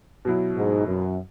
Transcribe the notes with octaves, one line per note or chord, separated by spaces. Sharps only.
B2 F#3 E4
G#2
F#2